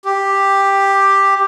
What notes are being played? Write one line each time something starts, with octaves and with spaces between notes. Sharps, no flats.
G4